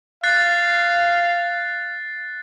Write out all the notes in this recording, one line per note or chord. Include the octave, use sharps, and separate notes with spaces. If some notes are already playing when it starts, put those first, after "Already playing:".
F5 F#6 A6 C7